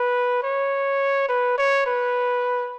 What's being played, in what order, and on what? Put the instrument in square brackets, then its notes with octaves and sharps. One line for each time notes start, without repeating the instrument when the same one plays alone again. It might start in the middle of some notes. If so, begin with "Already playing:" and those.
Already playing: [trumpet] B4
C#5
B4
C#5
B4